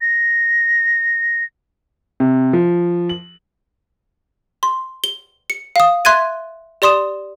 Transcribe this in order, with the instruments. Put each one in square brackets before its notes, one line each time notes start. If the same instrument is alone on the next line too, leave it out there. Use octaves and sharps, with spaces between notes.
[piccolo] A#6
[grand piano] C3
F3
F#7
[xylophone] C6
G7
C#7
F5 D#6
E5 C6 F#6 G#6 A6 D#7
G4 D5 C6 D#6 E7